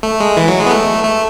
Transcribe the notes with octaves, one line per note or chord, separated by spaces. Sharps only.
A3
G#3
E3
F#3
G#3
B3
A3
A3